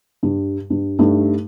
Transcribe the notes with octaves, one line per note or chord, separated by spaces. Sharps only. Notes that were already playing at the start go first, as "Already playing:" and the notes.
G2
G2
G2 A3 D#4